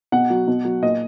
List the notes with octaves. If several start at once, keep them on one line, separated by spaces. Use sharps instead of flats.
B2 F#5
F#3
B2
F#3
A#2 D#5